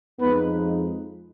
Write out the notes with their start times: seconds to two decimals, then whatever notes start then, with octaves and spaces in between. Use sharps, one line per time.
0.19 F2 F3 G#3 B3 D#4 B4